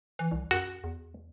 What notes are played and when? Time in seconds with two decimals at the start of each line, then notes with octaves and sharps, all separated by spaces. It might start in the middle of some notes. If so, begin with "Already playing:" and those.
0.19 E3
0.31 C2
0.51 F#2 F#4
0.84 E2